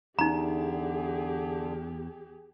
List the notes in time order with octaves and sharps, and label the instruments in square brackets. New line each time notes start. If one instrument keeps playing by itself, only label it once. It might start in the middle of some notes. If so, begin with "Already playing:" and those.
[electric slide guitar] E2 [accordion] D3 [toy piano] D#4 A#5 [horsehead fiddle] G4 G#4